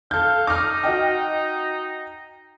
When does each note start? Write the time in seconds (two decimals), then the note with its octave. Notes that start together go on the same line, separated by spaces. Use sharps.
0.11 A4 F5 G6
0.47 D#4 D6 F6
0.83 F#4 D#5 G5